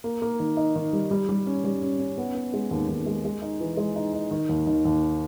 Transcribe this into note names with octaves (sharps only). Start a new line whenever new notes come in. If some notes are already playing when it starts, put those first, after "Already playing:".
A#3
A#3
D#3
D#4
D#3
G3
G3
G3
C#4
G3
C#4
C#4
B3
B3
G#3
D#2
D#2
G#3
G#3
D#4
E3
G#3
D#4
D#4
D#3
D#2
D#3
D#2